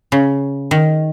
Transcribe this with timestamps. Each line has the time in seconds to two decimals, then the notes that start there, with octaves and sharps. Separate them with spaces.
0.12 C#3
0.71 D#3